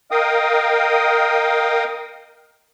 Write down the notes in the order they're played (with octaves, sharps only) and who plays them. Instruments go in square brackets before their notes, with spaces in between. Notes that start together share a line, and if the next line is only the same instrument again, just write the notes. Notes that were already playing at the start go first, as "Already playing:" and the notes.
[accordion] A#4 D#5 F5 G5 D#6